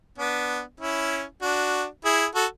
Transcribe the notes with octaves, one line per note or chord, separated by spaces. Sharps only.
B3 D4
C#4 E4
D4 F#4
E4 G#4
F#4 A4